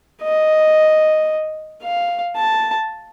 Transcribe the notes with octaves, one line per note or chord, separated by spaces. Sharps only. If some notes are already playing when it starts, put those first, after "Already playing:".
D#5
F5
A5